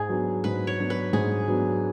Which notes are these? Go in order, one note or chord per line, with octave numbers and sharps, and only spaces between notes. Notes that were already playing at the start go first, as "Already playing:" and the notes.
Already playing: G#2 G#4
F#3 B3 D4
G#2 B4
C#5
F#3 B3 D4
B4
G#2 G#4
F#3 B3 D4